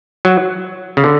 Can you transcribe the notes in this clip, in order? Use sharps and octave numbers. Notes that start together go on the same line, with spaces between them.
F#3
C#3
D3